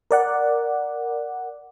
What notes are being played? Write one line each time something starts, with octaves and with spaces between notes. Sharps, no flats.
A#4 D5 F#5